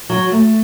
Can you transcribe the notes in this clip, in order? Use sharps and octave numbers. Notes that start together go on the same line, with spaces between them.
F#3
A3